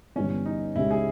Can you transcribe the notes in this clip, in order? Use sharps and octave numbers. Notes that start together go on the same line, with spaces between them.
G1 G2 E3 C#4
D#4
C#2 C#3 G#3 C#4 E4 G4
G#4